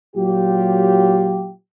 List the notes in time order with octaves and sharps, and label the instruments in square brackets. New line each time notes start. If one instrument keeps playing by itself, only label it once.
[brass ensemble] A#2 F#3 F4 G4